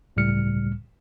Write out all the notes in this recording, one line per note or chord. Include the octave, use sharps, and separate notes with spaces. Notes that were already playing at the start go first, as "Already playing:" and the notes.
C#2 A2 C#3 G3 F6 C#7